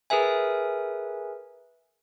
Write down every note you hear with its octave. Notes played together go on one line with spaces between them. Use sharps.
G#4 A#4 B4 E5 G#5